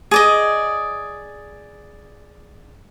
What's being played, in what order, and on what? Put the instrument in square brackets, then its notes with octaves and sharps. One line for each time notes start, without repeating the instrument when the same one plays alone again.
[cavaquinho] G#4 D5 D#5